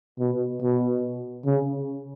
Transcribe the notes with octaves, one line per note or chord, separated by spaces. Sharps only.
B2
B2
C#3